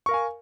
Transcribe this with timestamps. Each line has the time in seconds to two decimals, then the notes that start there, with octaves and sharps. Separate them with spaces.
0.06 C#6
0.09 A#4
0.11 F5
0.14 G#5